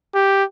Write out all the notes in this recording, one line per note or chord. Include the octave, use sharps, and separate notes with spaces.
G4